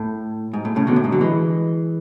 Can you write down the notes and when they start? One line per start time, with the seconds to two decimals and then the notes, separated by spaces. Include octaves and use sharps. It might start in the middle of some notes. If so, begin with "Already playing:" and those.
Already playing: A2
0.53 G#2
0.65 A2
0.76 A2 C#3
0.87 B2 D3
0.96 A2
1.04 G#2 B2
1.12 D3 F#3
1.21 E3 G#3